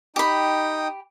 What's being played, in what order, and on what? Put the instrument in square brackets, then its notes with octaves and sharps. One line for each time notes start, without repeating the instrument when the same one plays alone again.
[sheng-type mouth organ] D#4 G5 D#6 [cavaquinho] G4 B5